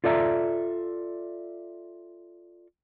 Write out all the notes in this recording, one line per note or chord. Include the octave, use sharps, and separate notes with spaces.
F4 A4 D5 E5 G#5 A#5